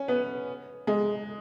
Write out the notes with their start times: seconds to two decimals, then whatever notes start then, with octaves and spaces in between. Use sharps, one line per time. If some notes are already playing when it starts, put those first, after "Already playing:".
Already playing: C#4
0.08 B3
0.87 G#3